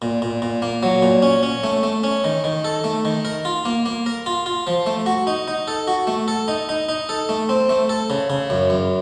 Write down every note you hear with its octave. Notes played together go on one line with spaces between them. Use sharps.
A#2
A#2
A#2
A#3
F#3
A#2
C#4
C#4
A3
A3
C#4
D#3
D#3
A4
A3
D#3
A#4
F4
A#3
A#3
A#4
F4
F4
F3
A3
F#4
D#4
D#4
A4
F#4
A3
A4
D#4
D#4
D#4
A4
A3
C4
A3
A4
C#3
C#3
F#2
F#2